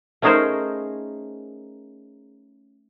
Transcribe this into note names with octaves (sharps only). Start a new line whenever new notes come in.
A3 C#4 D#4 G#4 A#4 C5